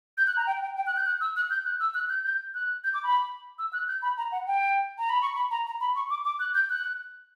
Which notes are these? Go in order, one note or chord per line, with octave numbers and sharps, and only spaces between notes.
G6
F#6
A#5
G5
G5
G5
F#6
G6
F#6
E6
F#6
G6
F#6
E6
F#6
G6
G6
F#6
G6
D6
B5
E6
F#6
G6
B5
A#5
F#5
G5
A#5
B5
C#6
B5
A#5
A#5
B5
C#6
D6
D6
F#6
G6
F#6